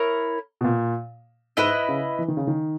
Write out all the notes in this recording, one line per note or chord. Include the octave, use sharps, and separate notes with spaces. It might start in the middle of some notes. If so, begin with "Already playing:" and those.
Already playing: E4 A#4 C#5
B2
A#2
G#2 E4 B4 D#5
C#3
E3
D#3
C#3
D#3